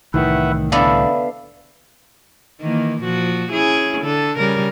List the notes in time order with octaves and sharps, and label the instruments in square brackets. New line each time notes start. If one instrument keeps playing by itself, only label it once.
[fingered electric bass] C2 A2 E3 [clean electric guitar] D#3 [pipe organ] B4 E5 F#5
[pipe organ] D3 [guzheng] B3 D4 A4 [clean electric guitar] D5 E5 F5
[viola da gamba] D#3 E3 A#3
A#2 F3 F#4
C#4 E4 G#4
D3 A4
C#3 G3 A#4